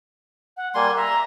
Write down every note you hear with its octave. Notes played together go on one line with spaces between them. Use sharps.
F#5
G3 A#3 G#5 C6
E5 A#5